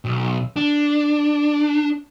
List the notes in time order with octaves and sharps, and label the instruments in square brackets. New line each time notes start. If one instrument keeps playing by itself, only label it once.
[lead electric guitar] B1
D4